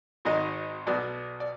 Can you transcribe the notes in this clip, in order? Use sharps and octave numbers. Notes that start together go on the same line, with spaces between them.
G#1 G#2 D#3 F#3 D#5
B1 B2 F#3 B3 D5
D5